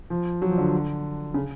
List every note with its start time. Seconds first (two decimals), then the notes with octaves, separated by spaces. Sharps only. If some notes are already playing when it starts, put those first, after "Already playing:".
0.10 F3
0.42 F#3
0.51 F3
0.58 D3
1.34 C#3